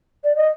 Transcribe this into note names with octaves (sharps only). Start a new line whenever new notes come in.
D5
D#5